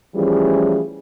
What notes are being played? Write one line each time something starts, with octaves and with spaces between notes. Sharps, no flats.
E3 F3 G3 A3 C#4 G#4